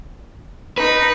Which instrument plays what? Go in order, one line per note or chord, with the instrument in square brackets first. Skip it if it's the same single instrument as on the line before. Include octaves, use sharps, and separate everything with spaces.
[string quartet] D#4 [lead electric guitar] B4